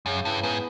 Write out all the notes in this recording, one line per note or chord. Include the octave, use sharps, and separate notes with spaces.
F#2 C#3
G2 E3
G#2 B3